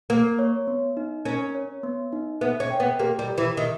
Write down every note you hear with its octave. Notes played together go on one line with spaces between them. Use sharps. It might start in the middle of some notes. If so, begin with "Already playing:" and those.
A#3 A#4
C#5
B3
D#4
C#4 A#4
C#5
B3
D#4
B3 E5
C#4
G5
B3
A#3 G4
G3
A#4
E3
D#3 E5